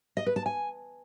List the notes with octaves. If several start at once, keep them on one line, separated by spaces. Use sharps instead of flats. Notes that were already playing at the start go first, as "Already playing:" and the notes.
D#5
B4
A5
G#5